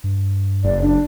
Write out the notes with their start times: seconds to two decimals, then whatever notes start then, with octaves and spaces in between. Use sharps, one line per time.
0.04 G2
0.64 F#1 D5
0.82 D4